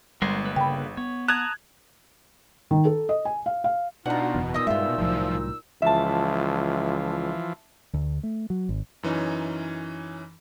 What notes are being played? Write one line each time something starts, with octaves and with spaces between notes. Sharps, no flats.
G1 G3 G#3 A#4 F#5 C6
D3 A#3 B4
C#3 G5 B5
B3 C#5
A5 A#5 D#6 F#6 G#6
D#3
A4
D#5
G#5
F5
F5
B2 D4 D#4 F4 F#5 A#5
F#1 E2
A#2 D#4 D#5 D#6 E6
G2 G#3 F4 E5
C2 A2 F3 F#3
C#2 E3 F3 E5 A5
D2
A3
F#3
G#1
F#2 E3 C#4 D#4